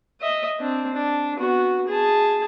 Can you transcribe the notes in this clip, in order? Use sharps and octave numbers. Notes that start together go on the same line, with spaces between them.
D#5 E5
C4 D4
D4
B3 F#4
G#4 A5